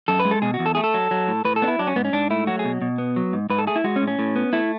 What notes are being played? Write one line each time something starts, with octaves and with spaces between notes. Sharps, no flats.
F#2 A4
B4
G#3
A4
B2 G#4
F#4
E2
A4
A3 G#4
A4
F#3
F#3
A2
A2 B4
A4
B3 D4
E4
F#3 D4
C#4
G#2 B3
C#4
G#2 D4
A3 E4
F#3 F#4
G#4
B2
B2
B3
F#3
G#2
G#2 B4
A4
A3 G#4
E4
G#3 F#4
C#4
A2
C#4
A2
B3
A3 E4